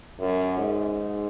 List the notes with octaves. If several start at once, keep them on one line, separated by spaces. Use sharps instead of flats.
F#2
G#2